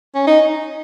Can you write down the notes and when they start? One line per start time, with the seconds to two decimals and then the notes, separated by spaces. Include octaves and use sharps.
0.15 C#4
0.27 D#4